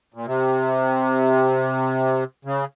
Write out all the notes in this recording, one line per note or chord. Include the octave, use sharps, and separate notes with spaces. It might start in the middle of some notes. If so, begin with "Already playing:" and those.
A#2
C3
C#3